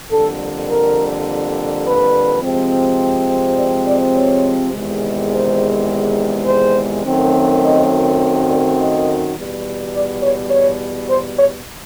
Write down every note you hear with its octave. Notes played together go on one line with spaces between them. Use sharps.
F2 D3 G3 A#3 A4
A#4
B4
C3 F3 G#3 C4
D5
D5
C#5
E2 C3 D#3 G#3
C5
C5
F#2 D#3 F#3 A3 C4
D#5
D5
D#5
E2 B2 G3
D5
C#5
C#5
C5
C#5